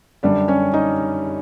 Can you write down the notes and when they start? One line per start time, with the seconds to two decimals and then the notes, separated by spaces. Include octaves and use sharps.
0.23 F#2 D3 G3 D4 D5
0.48 C#4 C#5
0.74 D#4 D#5